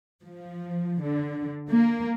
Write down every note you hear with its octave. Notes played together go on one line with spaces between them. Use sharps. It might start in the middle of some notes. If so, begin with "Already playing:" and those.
F3
D3
A#3